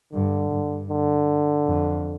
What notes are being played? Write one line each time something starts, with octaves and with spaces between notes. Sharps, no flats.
G2 D3
G2
D3
F2